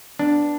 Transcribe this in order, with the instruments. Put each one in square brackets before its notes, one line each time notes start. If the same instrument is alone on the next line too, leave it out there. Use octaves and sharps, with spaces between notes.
[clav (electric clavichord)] B3 D4